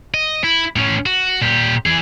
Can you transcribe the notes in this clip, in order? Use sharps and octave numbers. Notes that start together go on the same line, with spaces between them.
D#5
E4
A2 C#4
F#4
A#2 G4
E3 G#4